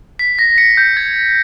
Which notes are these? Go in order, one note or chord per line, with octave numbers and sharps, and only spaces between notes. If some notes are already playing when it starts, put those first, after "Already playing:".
B6
A#6
C#7
G6
G#6